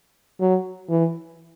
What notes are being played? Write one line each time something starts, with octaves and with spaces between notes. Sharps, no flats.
F#3
E3